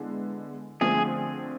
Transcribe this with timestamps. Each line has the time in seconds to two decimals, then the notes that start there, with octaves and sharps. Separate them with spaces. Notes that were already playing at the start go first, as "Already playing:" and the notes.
Already playing: D3 G#3 B3 E4
0.81 D3 F3 A3 C4 G#4